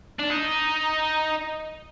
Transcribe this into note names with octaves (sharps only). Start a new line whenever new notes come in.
D4
D#4